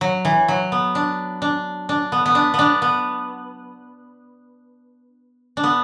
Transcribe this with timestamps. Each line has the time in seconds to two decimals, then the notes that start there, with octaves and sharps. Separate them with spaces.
0.01 F#3
0.25 E3
0.48 F#3
0.72 B3
0.95 D4
1.42 D4
1.89 D4
2.12 B3
2.26 B3
2.35 D4
2.54 B3 D4
2.82 B3
5.57 D4
5.64 B3